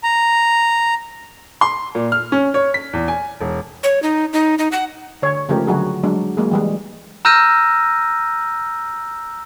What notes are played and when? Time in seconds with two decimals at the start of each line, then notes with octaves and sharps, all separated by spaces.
0.04 A#5
1.61 C6
1.95 A#2
2.12 F6
2.32 C#4
2.54 C#5
2.74 B6
2.93 E2
3.08 G#5
3.40 E1
3.83 C#5
4.03 D#4
4.33 D#4
4.58 D#4
4.72 F#5
5.22 D3 C#5
5.49 C#3 F3 G#3 A3 G4 A#4
5.67 D3 F#3 F#4 G#4
6.03 F#3 G#3 D4
6.37 F#3 G#3 A#3 G#4
6.51 E3 G3 G#3
7.25 A#5 E6 F6 G6 A#6 D#7